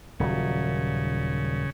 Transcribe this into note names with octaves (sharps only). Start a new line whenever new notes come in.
D#1 C#3 F#3